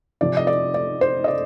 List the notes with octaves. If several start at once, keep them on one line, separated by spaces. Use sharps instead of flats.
C3 F3 C4 D5
D#5
D5
D5
C5
D#5
D5